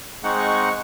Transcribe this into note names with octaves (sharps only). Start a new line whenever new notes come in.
G#3 C4 D#4 F#5 C#6